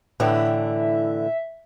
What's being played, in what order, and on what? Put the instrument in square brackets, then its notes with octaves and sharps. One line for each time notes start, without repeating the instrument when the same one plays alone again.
[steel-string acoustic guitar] A2 D3 E3 [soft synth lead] E5